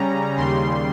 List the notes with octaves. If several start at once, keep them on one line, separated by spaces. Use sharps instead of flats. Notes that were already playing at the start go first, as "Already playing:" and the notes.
Already playing: C#3 G3 C#4 A#5
D#2 C#3 G3 C6